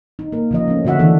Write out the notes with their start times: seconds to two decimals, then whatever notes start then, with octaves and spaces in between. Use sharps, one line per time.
0.19 D#4
0.32 A#3 A#4
0.51 C#3 F3 D#5
0.68 A3 C#4
0.85 B2 D3 F#4 E5 F#5
0.99 D#3 E3 F#3 A3 D4 A4